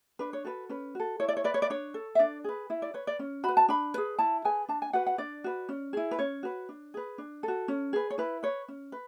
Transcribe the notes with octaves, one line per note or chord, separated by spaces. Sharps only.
D4 B4
C#5
F#4 A4 B4
C#4 B4
F#4 A4
E4 C#5
D5
C#5
B4 D5
C#5
D5
D4 C#5
A4
E5
D4 D5
G#4 B4
E4 E5
D5
B4 C#5
D5
C#4
F#4 B4 B5
A5
D4 B5
G#4 B4
E4 A5
G#4 B4 G#5
D4 A5
G#5
F#4 B4 F#5
F#5
D4 D5
F#4 B4
C#4
E4 G#4
B4
C#4 C#5
F#4 B4
D4
G#4 B4
D4
F#4 A4
C#4
G#4 B4
C#5
E4 B4
B4 C#5
C#4
B4